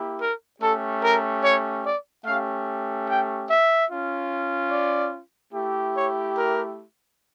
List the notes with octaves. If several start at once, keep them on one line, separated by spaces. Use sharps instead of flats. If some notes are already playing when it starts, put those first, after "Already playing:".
Already playing: A#3 E4 G4
A#4
A3 C#4 G4 A4
A#4
C#5
D5
A3 C#4 G4 F5
G5
E5
C#4 F4
D5
A3 E4 G4
C#5
A#4